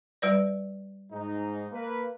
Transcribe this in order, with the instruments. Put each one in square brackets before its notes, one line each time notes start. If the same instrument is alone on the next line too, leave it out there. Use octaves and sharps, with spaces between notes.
[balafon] G3 B4 D5
[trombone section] G#2 D#4
A#3 B4